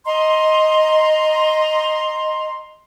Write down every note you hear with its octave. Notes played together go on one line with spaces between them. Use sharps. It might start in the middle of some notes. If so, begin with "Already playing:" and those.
D#5 A#5 C6